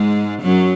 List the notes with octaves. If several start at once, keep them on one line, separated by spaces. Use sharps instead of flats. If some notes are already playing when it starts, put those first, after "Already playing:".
Already playing: G#2 G#3
F#2 F#3